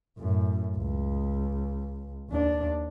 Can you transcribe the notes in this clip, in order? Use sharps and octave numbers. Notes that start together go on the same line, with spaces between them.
F#2 A2
C#2
D#2 D4